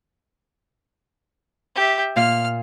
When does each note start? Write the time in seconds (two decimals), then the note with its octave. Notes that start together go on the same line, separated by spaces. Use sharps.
1.75 G4 E5
2.16 A#2 F5 F6